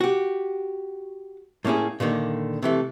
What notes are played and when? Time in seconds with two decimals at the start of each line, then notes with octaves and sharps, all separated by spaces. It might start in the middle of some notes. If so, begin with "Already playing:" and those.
0.01 F#4 G4
1.65 A2 A#3 C#4 E4 G#4
2.00 A#2 D3 D#3 A#3
2.62 C3 E3 A3